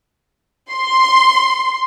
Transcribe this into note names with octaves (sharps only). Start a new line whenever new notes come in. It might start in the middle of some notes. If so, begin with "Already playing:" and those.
C6